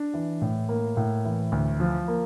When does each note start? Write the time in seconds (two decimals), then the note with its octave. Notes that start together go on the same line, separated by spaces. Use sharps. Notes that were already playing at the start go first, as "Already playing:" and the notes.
Already playing: D4
0.14 E3
0.41 A2
0.69 A#3
0.97 A2
1.25 E3
1.52 D2
1.80 F3
2.08 A#3